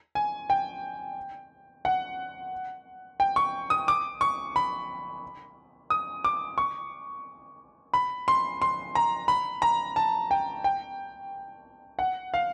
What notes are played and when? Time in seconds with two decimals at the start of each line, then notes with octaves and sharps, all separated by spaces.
0.15 G#5
0.50 G5
1.85 F#5
3.20 G5
3.36 C#6
3.70 D#6
3.88 D6
4.21 C#6
4.56 B5
5.90 D#6
6.24 D6
6.58 C#6
7.94 B5
8.28 C6
8.62 C6
8.95 A#5
9.28 B5
9.62 A#5
9.96 A5
10.31 G5
10.64 G5
11.99 F#5
12.34 F5